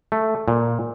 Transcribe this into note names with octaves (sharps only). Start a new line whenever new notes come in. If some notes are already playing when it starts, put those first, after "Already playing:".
A3
A#2